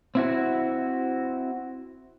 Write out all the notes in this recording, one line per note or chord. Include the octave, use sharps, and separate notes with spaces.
C4 E4 F#4